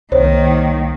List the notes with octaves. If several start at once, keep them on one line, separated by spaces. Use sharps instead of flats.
C2 D#3 A#3 C5 C#5